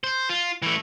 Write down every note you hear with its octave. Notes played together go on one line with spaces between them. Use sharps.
C5
F4
E3 A3